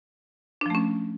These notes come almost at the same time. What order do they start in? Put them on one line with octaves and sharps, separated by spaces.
D4 F3 A3 C#4